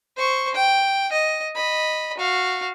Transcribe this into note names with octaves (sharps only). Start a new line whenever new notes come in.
C5 C#6
G5
D#5
D#5 B5
F#4 F5